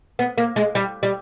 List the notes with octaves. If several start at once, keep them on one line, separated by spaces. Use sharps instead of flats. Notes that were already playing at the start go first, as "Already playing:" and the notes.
B3
A#3
G#3
G3
G3